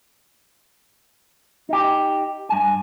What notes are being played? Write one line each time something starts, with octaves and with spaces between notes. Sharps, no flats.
D#4 G4
G2 G#5